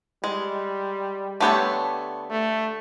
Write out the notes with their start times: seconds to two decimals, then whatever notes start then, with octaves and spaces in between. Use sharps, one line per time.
0.24 G3 G#3
1.40 D3 A3 B3 G4 A4 C#5
2.30 A3